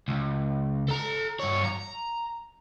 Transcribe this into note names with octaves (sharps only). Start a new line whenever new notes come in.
C#2
A4 A#5
G2 C#5
A#5